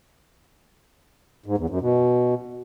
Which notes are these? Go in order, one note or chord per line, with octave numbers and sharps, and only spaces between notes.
G#2
E2
F#2
B2